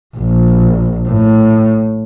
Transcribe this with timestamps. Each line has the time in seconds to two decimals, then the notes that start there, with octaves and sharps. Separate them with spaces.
0.17 A#1
1.08 A2